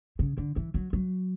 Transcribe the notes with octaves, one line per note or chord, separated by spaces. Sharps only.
C#3
D3
E3
F#3
F#3